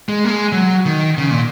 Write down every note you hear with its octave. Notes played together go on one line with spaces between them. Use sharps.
G#3
A#3
G#3
F#3
D#3
C#3
A#2